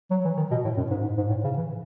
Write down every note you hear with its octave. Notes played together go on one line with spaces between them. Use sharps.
F#3
E3
D#3
B2
A2
F#2
G#2
G#2
G#2
A2
C#3
E3